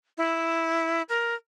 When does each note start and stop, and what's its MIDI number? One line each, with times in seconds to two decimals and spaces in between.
0.18 1.02 64
1.09 1.35 70